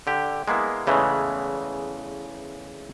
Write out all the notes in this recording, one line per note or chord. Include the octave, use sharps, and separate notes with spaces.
D3 G4
G#3 A#3 B3 E4
E2 C#3 E3 G#3 A3